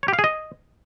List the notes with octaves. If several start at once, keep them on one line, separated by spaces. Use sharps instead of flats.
C#5
G4
F5
G#4
D#5